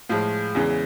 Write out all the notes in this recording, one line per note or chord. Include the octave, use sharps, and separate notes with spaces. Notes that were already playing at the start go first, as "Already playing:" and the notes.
A2 F3 G#3 F4
E2 C#3 E3 G#3